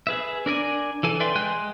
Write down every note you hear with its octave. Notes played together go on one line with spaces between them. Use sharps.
G#4 B4 E5
D4 A#4 D5 G#5
E3 A4 G#5
B4 D5 E5 G5 C6
G#3 G5 G#5 C6 F#6
G#3